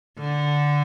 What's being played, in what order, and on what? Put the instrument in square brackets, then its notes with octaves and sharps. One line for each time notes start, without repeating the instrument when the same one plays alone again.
[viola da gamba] D3